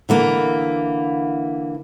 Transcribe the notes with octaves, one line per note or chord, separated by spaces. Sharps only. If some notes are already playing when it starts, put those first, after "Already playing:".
D3 E3 A#3